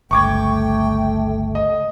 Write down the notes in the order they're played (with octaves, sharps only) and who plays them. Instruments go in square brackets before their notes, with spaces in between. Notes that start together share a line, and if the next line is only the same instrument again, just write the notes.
[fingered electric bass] G1 C#2 [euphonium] A3 [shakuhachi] G5 [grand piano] C#6 D6 G#6
[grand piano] D#5